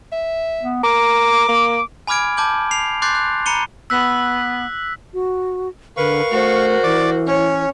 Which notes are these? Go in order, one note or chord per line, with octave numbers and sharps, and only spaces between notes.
E5
B3
A#4 D6
A#3
G#5 B5 D6 F6 G#6 D7
A5 D6 G6 F#7
C7 F7
C6 D6 F#6 G6 A6 C7
F#6
A#5 B5 C#7 D#7 G7
B3 E6 F#6 B6
F#4
D3 A#4 B4 F5 C#6
A3 F#4 C5
E3 D5 D6
C#4 C#5